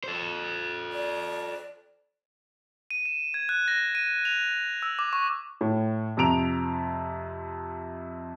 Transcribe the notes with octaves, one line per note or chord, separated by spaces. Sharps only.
A4 C5
D5
D#7
E7
G#6
F#6
A#6
D#7
F7
E6
D6
C#6
A2
F2 C3 A#5 D7 F7